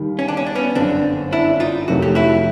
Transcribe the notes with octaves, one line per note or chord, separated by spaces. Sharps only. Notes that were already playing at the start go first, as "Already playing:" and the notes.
Already playing: D#2 D#3 G3
C#4
D4
C#4
D4
B3 C#4
G1 F#2 D3 C4 D4
D4 E4
D#4 F4
F2 C3 D#3 F#3 A3 F#4
G4
E4 F#4